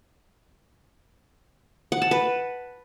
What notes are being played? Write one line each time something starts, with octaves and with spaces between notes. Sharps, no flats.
F#5
A5
B4